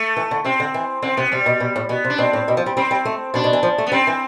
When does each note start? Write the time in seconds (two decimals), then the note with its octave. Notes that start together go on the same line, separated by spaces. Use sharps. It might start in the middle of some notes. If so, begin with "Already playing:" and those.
Already playing: A3
0.17 E3
0.31 D3
0.44 C3 C4
0.60 D3
0.74 E3
1.02 D3 C4
1.17 C3 B3
1.32 C3 G3
1.46 B2
1.60 B2
1.76 A2
1.89 B2 B3
2.04 C3
2.10 D4
2.18 B2 C4
2.33 A2
2.48 B2
2.57 F3
2.66 G3
2.77 G3 C4
2.91 G3
3.05 A3
3.34 B2 D4
3.44 B2
3.53 E3
3.63 F3
3.78 A3
3.87 B3
3.92 G3 C4
4.07 E3